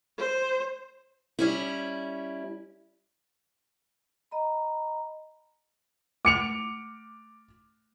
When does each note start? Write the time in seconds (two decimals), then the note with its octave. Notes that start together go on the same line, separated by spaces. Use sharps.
0.18 C5
1.39 G3 C#4 E4
4.31 D#5 A#5 B5
6.25 A3 D6 C#7 F7